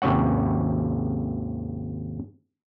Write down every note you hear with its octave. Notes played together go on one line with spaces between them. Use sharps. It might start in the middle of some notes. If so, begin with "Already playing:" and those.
G#1 D#2 C3 C#4 C#5 F#5